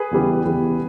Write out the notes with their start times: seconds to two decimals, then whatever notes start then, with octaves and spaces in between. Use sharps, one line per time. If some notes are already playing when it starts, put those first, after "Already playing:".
Already playing: G#4 B4
0.11 E2 C#3 E3 G3 B3
0.45 E2 C#3 E3 G3 B3